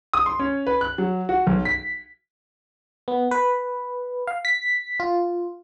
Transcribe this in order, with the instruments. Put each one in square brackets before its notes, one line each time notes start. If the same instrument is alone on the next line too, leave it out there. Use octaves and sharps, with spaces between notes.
[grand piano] D#6
C6
C#4
B4
F#6
F#3
F#4
B1
B6
[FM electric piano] B3
B4
F5
B6
F4